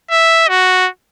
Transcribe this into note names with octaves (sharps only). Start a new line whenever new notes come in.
E5
F#4